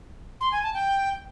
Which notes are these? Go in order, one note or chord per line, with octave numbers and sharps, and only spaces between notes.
C6
G#5
A5
G5